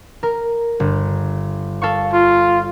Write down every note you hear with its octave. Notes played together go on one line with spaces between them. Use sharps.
A#4
G1
A4 F5 C#6
F4